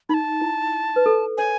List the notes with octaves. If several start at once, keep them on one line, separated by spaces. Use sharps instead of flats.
D#4 B5
A5
E4
B4
A4
C#5 G#5